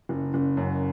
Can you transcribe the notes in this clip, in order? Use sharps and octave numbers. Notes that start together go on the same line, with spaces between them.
F#1
F#1
F#2